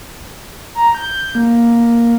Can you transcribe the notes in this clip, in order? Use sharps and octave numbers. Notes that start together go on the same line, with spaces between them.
A#5
G6
A#3